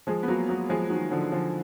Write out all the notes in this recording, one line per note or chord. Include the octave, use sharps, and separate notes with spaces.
F3 G#3
B3
F#3 A#3
F#3 A#3
F3 G#3
D#3 F#3
D3 F3
D3 F3